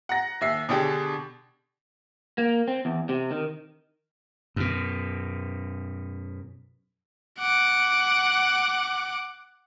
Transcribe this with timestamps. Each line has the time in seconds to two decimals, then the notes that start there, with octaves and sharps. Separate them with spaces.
0.09 F#5 A#5 A#6
0.41 D#2 E5 C7
0.69 B2 D3 D4 G4 G#4
2.38 A#3
2.68 C4
2.85 E2
3.09 C3
3.31 D#3
4.56 F#2 B2
7.40 F#5 D6